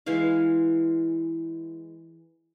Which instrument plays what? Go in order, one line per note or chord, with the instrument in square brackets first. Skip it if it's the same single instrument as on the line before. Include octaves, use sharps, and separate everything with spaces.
[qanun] E3 G#3 E4 F5